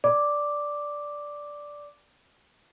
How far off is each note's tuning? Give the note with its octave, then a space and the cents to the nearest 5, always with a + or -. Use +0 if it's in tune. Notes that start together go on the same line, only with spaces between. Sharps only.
D5 -5 D6 +0